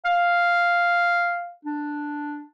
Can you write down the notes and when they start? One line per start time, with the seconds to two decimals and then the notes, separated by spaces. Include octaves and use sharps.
0.05 F5
1.65 D4